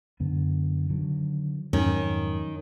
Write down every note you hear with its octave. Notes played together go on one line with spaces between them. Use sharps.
F#2 D3 B3
D3 D#3 F#3
F2 G#2 D#3 F#3 C#4